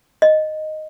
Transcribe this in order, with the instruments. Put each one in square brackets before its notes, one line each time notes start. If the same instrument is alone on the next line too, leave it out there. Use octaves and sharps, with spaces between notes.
[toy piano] D#5